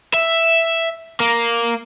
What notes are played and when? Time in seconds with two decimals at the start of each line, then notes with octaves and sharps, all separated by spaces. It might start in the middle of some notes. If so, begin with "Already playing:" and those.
0.14 E5
1.20 A#3